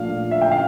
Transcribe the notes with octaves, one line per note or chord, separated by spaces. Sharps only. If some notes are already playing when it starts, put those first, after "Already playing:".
Already playing: A#2 F3 A3 D4 F5
E5
G5
F5